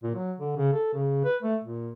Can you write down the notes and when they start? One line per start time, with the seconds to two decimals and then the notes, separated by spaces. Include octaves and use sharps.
0.03 A#2
0.15 F#3
0.40 D3
0.57 C#3
0.73 A4
0.93 C#3
1.25 B4
1.43 A3
1.64 A#2